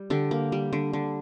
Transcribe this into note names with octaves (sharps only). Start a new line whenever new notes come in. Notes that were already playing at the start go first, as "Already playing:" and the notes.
Already playing: G3
D3 G4
A#3
G3
D3
D3